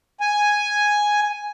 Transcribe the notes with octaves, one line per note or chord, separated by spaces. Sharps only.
G#5